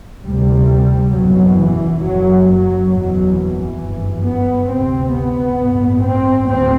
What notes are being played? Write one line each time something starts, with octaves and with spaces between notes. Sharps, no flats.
D2 C3 G3
F#1 E2 B2 F#3
E3
F#1 F#2 F#3
F#3
F#1 E2 B2 F#3
E3
G1 F#2
B3
D2 C3 C4
B3
A1 G2
C4
D2 C4